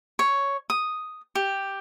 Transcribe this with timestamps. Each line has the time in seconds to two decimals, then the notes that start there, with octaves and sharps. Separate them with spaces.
0.19 C#5
0.70 D#6
1.35 G4